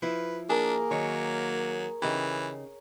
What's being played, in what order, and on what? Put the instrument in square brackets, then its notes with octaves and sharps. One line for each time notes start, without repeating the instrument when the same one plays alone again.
[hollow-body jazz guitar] F3 E4 [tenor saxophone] B4
[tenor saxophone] A#3 [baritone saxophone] D4 [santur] G#4 A#4
[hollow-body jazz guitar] D#3 [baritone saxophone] F#3 [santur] C#5
[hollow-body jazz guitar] C#3 D#4 G4 [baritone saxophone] E3